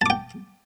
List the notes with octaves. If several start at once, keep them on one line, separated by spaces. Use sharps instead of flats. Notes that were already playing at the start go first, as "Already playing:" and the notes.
G5 A5 D6